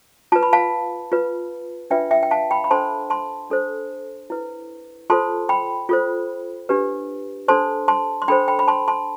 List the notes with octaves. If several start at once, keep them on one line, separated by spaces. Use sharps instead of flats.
F4 B4 A5
B5
F5 A5
F4 B4
D4 F4 B4 E5 G5
E5 G5
G5
F5 A5
G5 B5
B5
D4 A4 C5 A5 C6
A5 C6
D4 A4 C5
E4 B4
F4 A4 C5 A5 C6
G5 B5
F4 A4 C5
D4 G4 B4
D4 A4 C5 A5 C6
A5 C6
C6
D4 A4 C5 G5 B5
G5 B5
B5
A5 C6
A5 C6